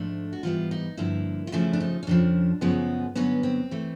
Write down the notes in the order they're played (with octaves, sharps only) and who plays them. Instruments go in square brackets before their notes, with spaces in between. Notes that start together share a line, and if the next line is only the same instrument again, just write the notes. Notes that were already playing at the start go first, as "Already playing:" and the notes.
Already playing: [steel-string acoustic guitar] G#2 F3 A3 D4
F#4
G#2 E3 G3 B3 F4
D#4
G2 D3 F3 A#3 E4
F4
F2 C#3 F3 A3 E4
D4
D#4
C#4
F2 C#3 F3 D4
F#2 C#3 F3 G#3 B3
G2 D3 F#3 B3 C#4
C4
E3 A3